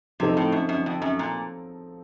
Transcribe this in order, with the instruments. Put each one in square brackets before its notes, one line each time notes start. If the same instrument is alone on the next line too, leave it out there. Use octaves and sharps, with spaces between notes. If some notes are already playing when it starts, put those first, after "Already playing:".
[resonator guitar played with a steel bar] C3 [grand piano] F3 C4 D#4 A4
[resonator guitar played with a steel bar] A2
F#2
F#2
F2
F#2
A#2